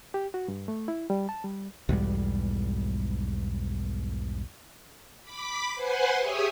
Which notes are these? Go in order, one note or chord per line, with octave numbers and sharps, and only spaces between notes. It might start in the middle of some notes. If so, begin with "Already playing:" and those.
G4
F#4
G2
A3
E4
G3
A5
G3
B1 E2 G#2 G3
B5 D6 B6
B4 C5 F#5 G#5 C6
G4 G#4 C#5 E5 G#5 D#6